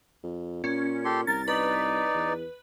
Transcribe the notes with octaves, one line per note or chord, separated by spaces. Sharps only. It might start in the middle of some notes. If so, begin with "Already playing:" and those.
F2
A#2 C#4
G4 A4 C6
C2 A#4 A6
D#4 B4 D5
E2